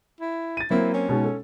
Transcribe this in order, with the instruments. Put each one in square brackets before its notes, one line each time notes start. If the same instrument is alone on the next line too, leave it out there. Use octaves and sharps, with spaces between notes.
[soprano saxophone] E4
[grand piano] A6 D#7
[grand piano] F#3 A#3 C4 [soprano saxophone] E4
[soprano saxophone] C#4
[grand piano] B2 G#3 D#4
A4